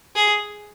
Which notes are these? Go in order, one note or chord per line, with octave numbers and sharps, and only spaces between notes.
G#4